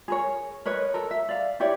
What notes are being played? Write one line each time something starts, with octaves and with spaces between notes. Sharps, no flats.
G#4 A#4 C#5
A#4 B4 C#5 D#5
A4 A#4
E5
D5 F5
E4 G4 C#5 D5